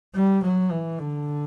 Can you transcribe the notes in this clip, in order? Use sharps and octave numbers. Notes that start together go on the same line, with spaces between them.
G3
F#3
E3
D3